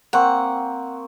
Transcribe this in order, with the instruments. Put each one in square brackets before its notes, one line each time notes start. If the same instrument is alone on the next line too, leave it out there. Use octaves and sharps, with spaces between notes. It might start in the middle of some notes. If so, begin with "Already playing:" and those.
[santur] A#3 C4 C#6 [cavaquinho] F#5